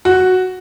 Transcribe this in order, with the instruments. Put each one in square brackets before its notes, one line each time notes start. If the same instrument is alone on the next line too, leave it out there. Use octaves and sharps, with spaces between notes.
[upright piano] F#4